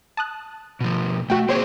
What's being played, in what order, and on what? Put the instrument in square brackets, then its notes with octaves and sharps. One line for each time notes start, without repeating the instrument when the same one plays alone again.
[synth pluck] A5 D#6 F#6
[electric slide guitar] B2 F3
[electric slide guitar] A3 [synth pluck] F#4 G5
[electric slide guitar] A#3 C4 G#4 [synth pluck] C5 C#5